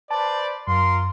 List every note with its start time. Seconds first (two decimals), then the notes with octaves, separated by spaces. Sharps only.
0.11 B4 C5 D5 A5
0.67 F#2 F4 A#4 C6